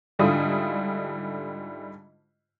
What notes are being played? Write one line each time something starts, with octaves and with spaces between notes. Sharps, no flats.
G#2 D3 G3 E4 F4 D#6